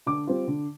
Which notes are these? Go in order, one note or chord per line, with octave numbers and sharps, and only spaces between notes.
D3 D6
G3 C4 F4
D3